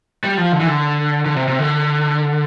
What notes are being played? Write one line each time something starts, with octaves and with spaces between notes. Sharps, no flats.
G3
F3
D3
E3
D3
D3
C3
C3
D3